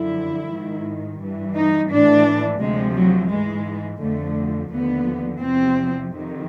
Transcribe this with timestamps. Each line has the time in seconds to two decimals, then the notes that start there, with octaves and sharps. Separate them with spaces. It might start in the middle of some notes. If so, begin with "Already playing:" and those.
Already playing: F#2 D3 F3 E4
0.50 G#2 D#3
1.20 G2 E3
1.55 D#4
1.90 A2 E3 D4
2.60 D2 C3 F3 G#3
2.96 F#3
3.30 G#2 E3 G#3
4.00 F2 D3 F3 A3
4.71 D#2 D3 F3 B3
5.41 E2 C3 F3 C4
6.12 F2 C3 D#3